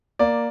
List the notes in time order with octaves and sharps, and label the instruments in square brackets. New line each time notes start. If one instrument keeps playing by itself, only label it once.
[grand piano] A#3 D5